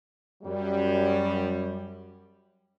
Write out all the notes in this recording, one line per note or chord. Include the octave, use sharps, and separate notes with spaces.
F#2 G3